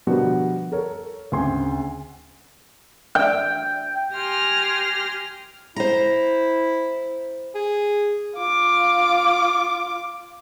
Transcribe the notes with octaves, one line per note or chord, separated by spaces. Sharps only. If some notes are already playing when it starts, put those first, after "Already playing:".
B2 D3 F3 G3 F#4 A#4
A4 A#4 C#5
D2 C#3 C4 G#5 C6
G5
G4 G#5 C6 F6 A#6
E4 C5 A#5
G#4
F4 D6